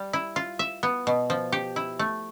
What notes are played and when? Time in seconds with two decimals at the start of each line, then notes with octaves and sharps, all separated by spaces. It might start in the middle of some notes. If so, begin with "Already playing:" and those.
Already playing: G3
0.13 E4
0.36 F4
0.59 E5
0.83 B3
1.07 B2
1.30 F3
1.52 G4
1.76 E4
1.99 A3